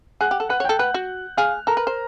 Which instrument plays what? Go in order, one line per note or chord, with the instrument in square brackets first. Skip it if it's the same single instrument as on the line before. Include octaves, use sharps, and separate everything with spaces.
[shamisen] G#4 [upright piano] F#5 F#6
[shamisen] G4
A4
[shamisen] B4 [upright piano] F#5 F#6
[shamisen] C#5
[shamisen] A4 [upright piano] G5 G6
[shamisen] B4 [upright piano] F#5 F#6
[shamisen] F#4
[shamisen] G#4 [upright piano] F5 F6
[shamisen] A4 [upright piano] A#4 A#5
[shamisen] B4
C5